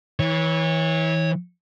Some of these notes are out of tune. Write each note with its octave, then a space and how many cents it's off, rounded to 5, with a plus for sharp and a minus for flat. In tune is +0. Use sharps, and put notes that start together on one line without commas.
E3 -30 C#5 -10